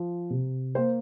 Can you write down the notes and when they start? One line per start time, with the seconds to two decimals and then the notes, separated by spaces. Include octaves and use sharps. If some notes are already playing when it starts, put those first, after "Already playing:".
Already playing: F3
0.30 C3
0.75 A#3 C5